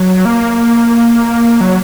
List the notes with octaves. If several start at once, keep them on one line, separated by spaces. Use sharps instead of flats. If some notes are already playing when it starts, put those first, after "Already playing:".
Already playing: F#3
A#3
F#3